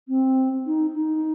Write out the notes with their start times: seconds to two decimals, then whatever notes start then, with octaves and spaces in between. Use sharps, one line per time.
0.08 C4
0.66 D#4
0.95 D#4